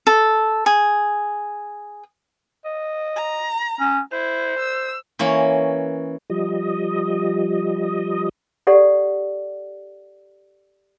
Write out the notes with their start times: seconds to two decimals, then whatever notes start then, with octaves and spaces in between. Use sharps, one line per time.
0.07 A4
0.66 G#4
2.65 D#5
3.16 A#5
3.80 C#4
4.12 E4 C5
4.59 E6
5.19 E3 A#3 C#4 C#5
6.30 F3 G3 D#5
8.67 G4 A4 D5 F#5